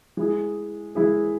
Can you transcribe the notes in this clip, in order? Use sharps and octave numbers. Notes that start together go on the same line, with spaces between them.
G#3 E4 G#4
G#3 E4 G#4